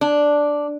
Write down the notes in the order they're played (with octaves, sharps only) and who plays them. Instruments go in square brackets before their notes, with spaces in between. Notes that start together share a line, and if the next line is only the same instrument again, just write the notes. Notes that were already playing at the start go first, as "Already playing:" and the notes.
[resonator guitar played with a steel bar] D4